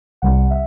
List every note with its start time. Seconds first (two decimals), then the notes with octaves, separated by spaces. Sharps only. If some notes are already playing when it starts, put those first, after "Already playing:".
0.22 C2 C3 G3 F#5
0.51 E5